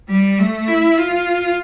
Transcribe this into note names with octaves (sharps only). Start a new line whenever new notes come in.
G3
A3
E4
F4